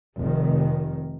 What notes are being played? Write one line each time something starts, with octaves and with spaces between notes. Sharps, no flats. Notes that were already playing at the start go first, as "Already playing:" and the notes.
F1 D#3